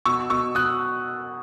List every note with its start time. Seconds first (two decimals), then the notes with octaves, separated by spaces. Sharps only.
0.05 B2 C#6 E6
0.30 B2 C#6 E6
0.55 B2 D#6 F#6